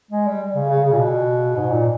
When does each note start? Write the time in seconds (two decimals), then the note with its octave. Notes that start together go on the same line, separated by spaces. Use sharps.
0.11 G#3
0.27 G3
0.55 C#3
0.69 C#3
0.84 C#3
0.92 A#2
0.98 B2
1.56 G#2
1.71 A#2